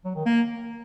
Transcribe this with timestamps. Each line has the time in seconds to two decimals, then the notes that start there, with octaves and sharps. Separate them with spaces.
0.05 F#3
0.15 D#3
0.26 A#3